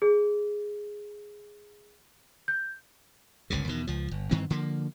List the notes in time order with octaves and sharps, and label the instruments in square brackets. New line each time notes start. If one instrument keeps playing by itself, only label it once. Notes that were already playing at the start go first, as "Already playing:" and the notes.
[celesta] G#4
G6
[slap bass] G1 C#2 A#2 C#3
E2 B2 D#3
C#2 F3
G1
G2 D#3 E3 C4
D3 F3 A#3